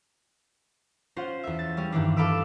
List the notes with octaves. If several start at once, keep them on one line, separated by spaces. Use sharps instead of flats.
C#4 F4 C5 F#5
E2 E5
A6
G3 C#4
G2 D#3 E3 D4
F4 A4 F5 B5 D6 E6